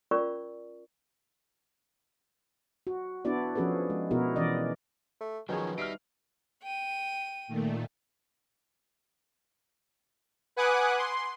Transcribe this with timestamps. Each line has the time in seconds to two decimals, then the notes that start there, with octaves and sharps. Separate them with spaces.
0.11 C#4 F4 A#4 D5 C#6
2.87 F#4
3.25 B3 D4 E4 F#4 D5
3.55 F3 C#4 F#4 G#4 A4 B4
3.90 G#3
4.11 B2 B3 E4 F#4 G#4 A#4
4.36 E3 C#4 D5 D#5
5.20 A3
5.49 B2 D#3 F3 F#3 C#4 D#4 G#4 C#5
5.78 G3 D#4 E5 F6 C7 D7
6.63 G5 D#7
7.48 A#2 D#3 A3
10.56 B4 F#5 G#5 D6 D#6 F#6
10.98 C6